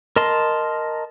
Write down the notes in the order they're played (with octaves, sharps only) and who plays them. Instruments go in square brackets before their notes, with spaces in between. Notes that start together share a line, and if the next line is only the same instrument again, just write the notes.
[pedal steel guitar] A#4 D#5 A5 C6